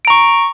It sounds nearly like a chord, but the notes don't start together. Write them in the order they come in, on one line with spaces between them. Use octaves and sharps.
D7 A#5 C#6